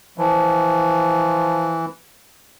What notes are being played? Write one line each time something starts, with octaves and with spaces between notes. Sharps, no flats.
E3 F3